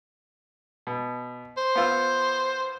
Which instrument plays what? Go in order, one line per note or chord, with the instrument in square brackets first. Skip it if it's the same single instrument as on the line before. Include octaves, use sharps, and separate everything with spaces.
[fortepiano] B2
[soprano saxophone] C5
[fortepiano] B3 F4 E6